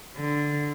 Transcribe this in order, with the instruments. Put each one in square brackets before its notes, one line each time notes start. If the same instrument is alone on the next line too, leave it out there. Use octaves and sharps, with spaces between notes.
[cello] D3